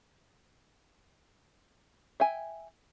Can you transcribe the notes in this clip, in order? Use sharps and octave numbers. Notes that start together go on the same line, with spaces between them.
E5 G5 G#5